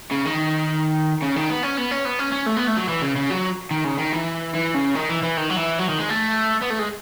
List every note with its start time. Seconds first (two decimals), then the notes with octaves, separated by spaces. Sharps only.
0.11 C#3
0.25 D#3
1.22 C#3
1.36 D#3
1.50 B3
1.63 C#4
1.77 B3
1.91 C#4
2.05 B3
2.19 C#4
2.32 C#4
2.47 A3
2.57 B3
2.68 A3
2.77 F#3
2.89 E3
3.02 C#3
3.16 C#3
3.30 F#3
3.71 D#3
3.84 C#3
3.98 D#3
4.12 E3
4.55 E3
4.75 C#3
4.95 D#3
5.09 E3
5.23 E3
5.37 D#3
5.50 F#3
5.57 E3
5.79 F#3
5.89 D#3
5.99 G#3
6.09 A3
6.62 B3
6.70 A3
6.79 G#3